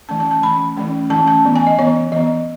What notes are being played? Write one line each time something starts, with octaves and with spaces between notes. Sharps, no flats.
E3 A3 C#4 A5
A5
A5
E3 A3 C#4 B5
E3 A3 C#4
E3 A3 C#4 A5
A5
E3 B3
G#5
D#5
E3 B3 C#5
E3 B3 D#5